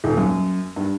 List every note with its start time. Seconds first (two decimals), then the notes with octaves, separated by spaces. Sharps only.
0.04 D#1
0.17 F#2
0.76 G2